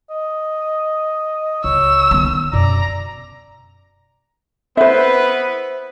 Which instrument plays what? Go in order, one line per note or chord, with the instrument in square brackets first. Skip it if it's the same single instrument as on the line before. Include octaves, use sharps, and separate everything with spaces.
[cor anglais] D#5
[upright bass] C#2 [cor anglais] C#5 [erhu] E6
[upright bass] D#3 B3
[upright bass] F#2 B2 [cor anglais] D5 [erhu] A#5
[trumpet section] B3 E4 B4 [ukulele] C5 E5